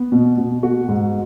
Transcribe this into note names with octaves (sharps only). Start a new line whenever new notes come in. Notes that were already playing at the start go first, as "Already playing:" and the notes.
Already playing: B3
B2
B2
F#4
G#2